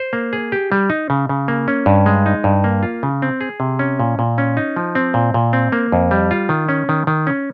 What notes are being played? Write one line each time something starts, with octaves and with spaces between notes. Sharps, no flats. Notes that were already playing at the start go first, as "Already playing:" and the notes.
Already playing: C5
A#3
G#4
G4
G3
D#4
C#3
C#3
A#3
C#4
G2
G#3
D#4
G2
A#3
F4
C#3
C4
G#4
C3
C#4
A#2
A#2
C#4
D#4
F3
C4
A#2
A#2
C4
A#3
F2
G3
F4
D#3
C#4
D#3
D#3
C#4